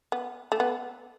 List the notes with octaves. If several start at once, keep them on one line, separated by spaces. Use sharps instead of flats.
B3
A3
B3